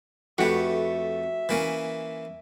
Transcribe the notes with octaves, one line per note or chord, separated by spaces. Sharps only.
F2 A3 F#4 G4 B4 E5
E3 A#3 C#4